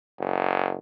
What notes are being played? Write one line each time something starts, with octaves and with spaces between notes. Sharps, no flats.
F#1